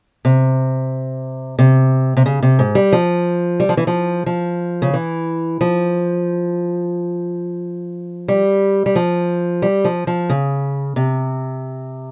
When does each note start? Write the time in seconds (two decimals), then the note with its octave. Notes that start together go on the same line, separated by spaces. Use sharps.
0.25 C3
1.59 C3
2.17 C3
2.26 C#3
2.43 C3
2.59 G#2
2.75 G3
2.93 F3
3.60 G3
3.69 F3
3.77 E3
3.87 F3
4.26 F3
4.82 C#3
4.93 E3
5.61 F3
8.28 G3
8.86 G3
8.96 F3
9.62 G3
9.85 F3
10.07 F3
10.30 C#3
10.96 C3